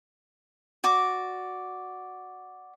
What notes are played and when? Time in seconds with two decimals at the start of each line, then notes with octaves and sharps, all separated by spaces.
0.84 F#4 D5 D6